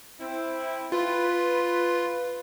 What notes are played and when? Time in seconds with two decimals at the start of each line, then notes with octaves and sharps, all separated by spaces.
0.20 C4 E4
0.92 F4 B4